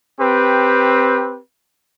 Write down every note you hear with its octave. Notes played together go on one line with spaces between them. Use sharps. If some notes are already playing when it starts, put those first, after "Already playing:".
C4 G4 B4